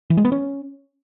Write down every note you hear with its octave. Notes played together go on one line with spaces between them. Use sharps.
E3
G#3
B3
C#4